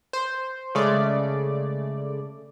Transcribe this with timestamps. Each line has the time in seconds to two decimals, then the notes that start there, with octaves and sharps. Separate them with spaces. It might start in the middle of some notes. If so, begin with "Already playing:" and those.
0.13 C5
0.75 C#3 G#3 A3 D5